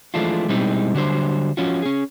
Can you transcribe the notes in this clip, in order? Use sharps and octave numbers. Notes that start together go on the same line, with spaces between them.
E3 F3 G#3 A3 D4 F4
B2 G3 G#3 C4 D#4 E4
D3 F#3 G3 D4 C5
F3 C#4 F4 F#4
C#4 G#4